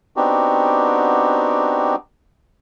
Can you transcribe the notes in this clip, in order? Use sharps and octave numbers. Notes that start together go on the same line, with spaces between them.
B3 C4 D4 D#4 F#4 G4